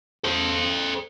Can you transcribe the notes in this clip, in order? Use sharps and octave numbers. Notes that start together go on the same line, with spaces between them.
A4 C5